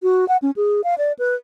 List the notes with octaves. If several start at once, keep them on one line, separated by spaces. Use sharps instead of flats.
F#4
F#5
C#4
G#4
F5
D5
B4